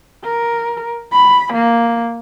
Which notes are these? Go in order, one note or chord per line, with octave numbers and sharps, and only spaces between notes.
A#4
B5
A#3